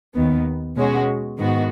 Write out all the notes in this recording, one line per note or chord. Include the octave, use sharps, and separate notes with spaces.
D#2 D#3 B3
B2 G#3 C#4 F#4
G#2 D#3 B3 F#4